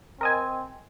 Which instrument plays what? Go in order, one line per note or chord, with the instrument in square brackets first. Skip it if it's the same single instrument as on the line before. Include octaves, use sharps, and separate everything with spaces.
[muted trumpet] C4 [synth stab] A#4 D#5 G#5